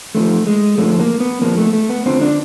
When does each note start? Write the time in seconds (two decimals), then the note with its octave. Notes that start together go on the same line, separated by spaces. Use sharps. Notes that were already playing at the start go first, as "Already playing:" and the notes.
0.15 F2 D3 F3 A3
0.47 G#3
0.78 F2 D3 F3 A3
1.00 A#3
1.20 B3
1.41 F2 D3 F3 A#3
1.58 A3
1.73 A3
1.89 B3
2.06 F2 D3 F3 C4
2.21 D4